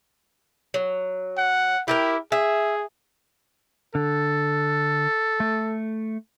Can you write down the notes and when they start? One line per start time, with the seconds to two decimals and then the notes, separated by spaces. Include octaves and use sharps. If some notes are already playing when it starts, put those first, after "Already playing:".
0.74 F#3
1.37 F#5
1.88 E4 G4 A4 A#4
2.32 G#4 E5
3.95 D3 A4
5.40 A3